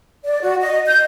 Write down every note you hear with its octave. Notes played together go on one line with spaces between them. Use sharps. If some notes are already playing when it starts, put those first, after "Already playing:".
D5
F#4
D#5
G6